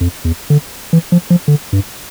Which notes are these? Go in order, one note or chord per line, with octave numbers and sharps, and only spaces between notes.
F2
E2
D3
E3
F3
F3
D3
G2